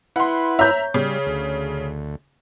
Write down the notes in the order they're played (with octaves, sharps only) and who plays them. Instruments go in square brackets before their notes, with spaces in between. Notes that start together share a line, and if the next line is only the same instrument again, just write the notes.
[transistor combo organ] E4 B4 [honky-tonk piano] F#5 C6
[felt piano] C#5 G6 [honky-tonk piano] E5 A#5
[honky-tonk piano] C#3 [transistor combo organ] G3
[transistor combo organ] D2